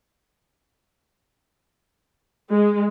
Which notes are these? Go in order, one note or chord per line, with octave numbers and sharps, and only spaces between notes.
G#3